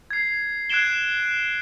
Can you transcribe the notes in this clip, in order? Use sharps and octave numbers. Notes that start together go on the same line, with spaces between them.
G#6 C7
F#6 G#6 C7 D7 E7 G7